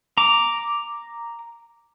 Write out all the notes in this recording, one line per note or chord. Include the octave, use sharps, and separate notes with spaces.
A#5 D6